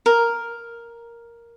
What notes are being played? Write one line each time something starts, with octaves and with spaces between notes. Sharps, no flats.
A#4